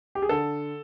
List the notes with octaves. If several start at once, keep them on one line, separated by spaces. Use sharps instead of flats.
G4
G#4
D3 A4